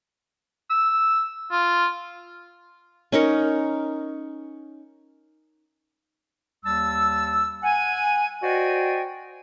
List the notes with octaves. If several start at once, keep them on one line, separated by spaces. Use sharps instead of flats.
E6
F4
C#4 D#4 A#4 C#5
D#2 G3 A5 E6
F#5 G#5
F#4 C5 D5 D#5 G5 G#5